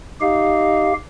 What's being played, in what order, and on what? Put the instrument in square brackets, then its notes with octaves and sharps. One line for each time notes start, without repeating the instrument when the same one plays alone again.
[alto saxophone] D#4 [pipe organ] G4 F5